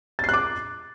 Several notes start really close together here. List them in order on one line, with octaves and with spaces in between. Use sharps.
A6 C7 F#6 D6